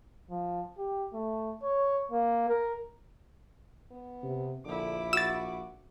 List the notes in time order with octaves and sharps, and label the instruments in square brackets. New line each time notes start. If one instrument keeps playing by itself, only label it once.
[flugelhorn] F3
G4
A3
C#5
A#3
A#4
[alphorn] B3
[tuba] C3
[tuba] A#1 [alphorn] D3 [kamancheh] E4 D6
[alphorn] F#4 [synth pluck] E6 A6